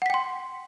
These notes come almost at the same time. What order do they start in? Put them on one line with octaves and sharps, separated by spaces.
F#5 B6 G5 C6